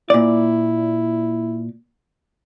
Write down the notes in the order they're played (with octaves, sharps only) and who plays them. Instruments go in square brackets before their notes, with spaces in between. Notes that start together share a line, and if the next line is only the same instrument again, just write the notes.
[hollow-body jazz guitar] A#2 D5 [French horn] E4